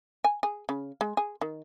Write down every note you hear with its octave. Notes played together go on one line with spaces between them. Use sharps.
G#5
G#4
C#3
G#3
G#4
D#3